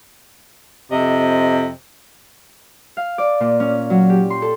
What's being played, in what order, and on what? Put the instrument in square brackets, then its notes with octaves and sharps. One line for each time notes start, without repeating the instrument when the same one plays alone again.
[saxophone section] F2 C3 D#5
[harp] F5
D5
A#2
C#4
F#3
G4
C6
A4